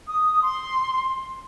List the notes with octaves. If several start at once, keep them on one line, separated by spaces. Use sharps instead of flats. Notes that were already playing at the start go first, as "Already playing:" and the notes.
D#6
C6